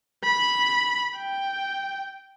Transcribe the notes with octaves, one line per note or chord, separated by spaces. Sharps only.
B5
G5